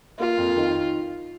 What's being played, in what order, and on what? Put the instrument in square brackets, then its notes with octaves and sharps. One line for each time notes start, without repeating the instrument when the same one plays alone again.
[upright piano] A#3 [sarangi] F4
[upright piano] F2
D#3